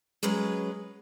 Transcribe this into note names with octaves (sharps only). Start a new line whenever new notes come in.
F#3 G#3 C#4 B4